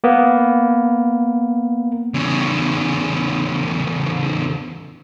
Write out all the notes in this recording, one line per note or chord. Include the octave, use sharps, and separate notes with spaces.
A#3 B3
E2 C#3